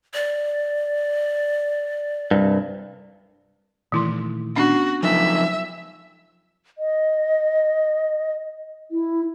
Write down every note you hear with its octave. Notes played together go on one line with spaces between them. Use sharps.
D5
C2 G2
A#2 D#3 E3 A3 E4 C6
B3 C#4 D4 F#4
F2 F3 F#3 D#4 E5
D#5
E4